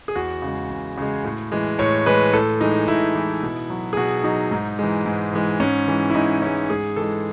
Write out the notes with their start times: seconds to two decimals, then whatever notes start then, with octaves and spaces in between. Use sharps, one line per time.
0.08 G#4
0.15 E2 F#4
0.42 C#3 G#3
0.70 E2
0.97 C#3 G#3
1.24 A2
1.52 E3 G#3
1.79 A2 C#5
2.06 E3 G#3 B4
2.33 A2 A4
2.61 E3 G#3 D#4
2.88 A2 E4
3.15 E3 G#3
3.42 B2
3.70 F#3
3.93 G#4
3.97 B2 F#4
4.24 F#3 D#4
4.51 G#2
4.79 E3 G#3
5.06 G#2
5.33 E3 G#3
5.60 G#2 C#4
5.87 E3 G#3
6.10 E4
6.15 G#2 D#4
6.42 E3 G#3 C#4
6.70 G#2 G#4
6.96 E3 G#3 A4